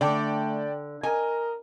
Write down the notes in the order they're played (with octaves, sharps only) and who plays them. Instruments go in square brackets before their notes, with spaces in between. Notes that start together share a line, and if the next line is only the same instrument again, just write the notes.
[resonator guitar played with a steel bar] D3 [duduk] A3 [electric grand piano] D5 G5 A5
[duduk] A#4 [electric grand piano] D#5 [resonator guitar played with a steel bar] G#5